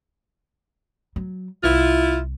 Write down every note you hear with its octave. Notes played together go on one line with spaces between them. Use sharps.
F#3
C2 E4 F4